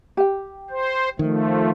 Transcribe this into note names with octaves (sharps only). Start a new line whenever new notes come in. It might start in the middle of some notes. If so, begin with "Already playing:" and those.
G4 G5
C5
D#3 F3 A3